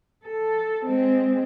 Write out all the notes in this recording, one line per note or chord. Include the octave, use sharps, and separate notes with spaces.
A4
G#3 C4